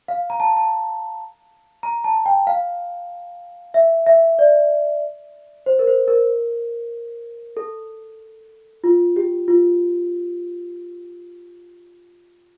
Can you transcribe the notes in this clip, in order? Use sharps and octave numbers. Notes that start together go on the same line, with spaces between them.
F5
A#5
A5
A5
A#5
A5
G5
F5
E5
E5
D5
C5
A#4
C5
A#4
A4
F4
G4
F4